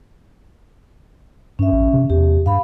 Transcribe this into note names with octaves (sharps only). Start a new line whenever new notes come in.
G2 C#4 E5
A1
C3
E2 G4
G2 F5 B5